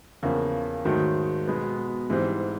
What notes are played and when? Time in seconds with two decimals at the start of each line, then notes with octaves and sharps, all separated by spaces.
0.23 E2 C#3 F3 A#3
0.85 G#2 D#3 F#3 A3
1.47 B2 G#3 B3
2.10 G#2 E3 G3 C4